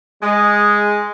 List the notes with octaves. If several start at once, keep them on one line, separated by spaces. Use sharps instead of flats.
G#3